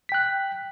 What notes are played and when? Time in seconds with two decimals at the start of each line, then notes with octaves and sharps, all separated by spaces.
0.09 B6
0.12 G5
0.14 F#6